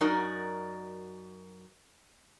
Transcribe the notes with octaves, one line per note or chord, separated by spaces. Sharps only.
F#2 D#4 F#4 A#4 D5